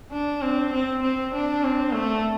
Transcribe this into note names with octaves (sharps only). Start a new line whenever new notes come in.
D4
C4
C4
C4
D4
C4
A3